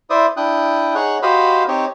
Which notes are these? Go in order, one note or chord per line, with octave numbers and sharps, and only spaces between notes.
E4 C5 D5 E5 D#6
D4 E4 G5 D#6 F#6
D#4 G#4 C#5 F#5 F#6
F#4 G4 C5 D#5 F5 B5
C4 D#4 G4 C#5